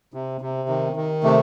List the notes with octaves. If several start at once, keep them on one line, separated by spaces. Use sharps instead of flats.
C3
C3
D#3
D#3
C3 A3